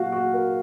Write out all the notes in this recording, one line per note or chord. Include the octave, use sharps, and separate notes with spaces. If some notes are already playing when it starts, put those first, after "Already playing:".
Already playing: A#2 F#3 F#4 F5
F#4
A#4